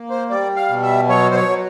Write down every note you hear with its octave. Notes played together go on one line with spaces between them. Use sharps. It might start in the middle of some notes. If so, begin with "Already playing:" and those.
Already playing: A#3
C5
G3 D5
F5
B2
E5
F#3 C#5
C5
C#5
F#3